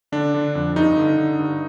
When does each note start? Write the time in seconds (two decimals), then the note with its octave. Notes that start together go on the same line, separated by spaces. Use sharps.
0.12 D3 D4
0.34 D3
0.55 F2
0.76 G2 D#4
0.97 D3
1.18 D3
1.39 G2